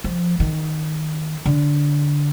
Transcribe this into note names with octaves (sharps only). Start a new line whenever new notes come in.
F3
D#3
D3